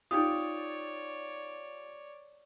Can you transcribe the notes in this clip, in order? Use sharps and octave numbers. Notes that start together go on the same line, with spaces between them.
D#4 F4 G4 C#5 D5 D#6